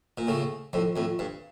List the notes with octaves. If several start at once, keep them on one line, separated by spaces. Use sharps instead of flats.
A#2
A2 C#3
F2 A2
F2 A2
G2